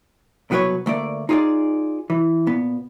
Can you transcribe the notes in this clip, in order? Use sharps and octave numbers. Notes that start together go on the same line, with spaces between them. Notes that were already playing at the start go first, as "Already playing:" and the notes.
C2 B2 F#3 F4 B4 C#5
D2 A3 A#3 D5
D#4 F4 G#4 C#5 D5
E3
A#2 B3